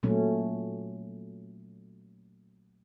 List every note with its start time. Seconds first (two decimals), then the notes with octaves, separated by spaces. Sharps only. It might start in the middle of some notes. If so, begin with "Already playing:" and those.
0.03 A#2 F#3 A3 C#4